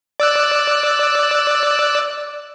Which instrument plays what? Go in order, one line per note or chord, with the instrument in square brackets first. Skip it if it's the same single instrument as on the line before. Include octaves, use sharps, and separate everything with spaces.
[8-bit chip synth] D5 E6 F#6